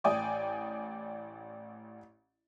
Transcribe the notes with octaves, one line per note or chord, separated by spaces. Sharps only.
A1 D5 G5 G#5 D6 D#6